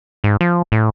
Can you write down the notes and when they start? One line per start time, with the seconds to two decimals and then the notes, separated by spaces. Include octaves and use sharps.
0.24 G#2
0.41 F3
0.72 A2